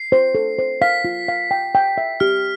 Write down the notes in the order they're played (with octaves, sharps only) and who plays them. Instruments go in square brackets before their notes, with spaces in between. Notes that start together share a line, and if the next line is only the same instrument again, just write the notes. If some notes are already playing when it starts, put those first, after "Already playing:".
Already playing: [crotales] C7
[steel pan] C5
A4
C5
[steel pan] F5 [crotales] B6
[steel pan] F4
F5
G5
G5
E5
[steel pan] G4 [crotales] F6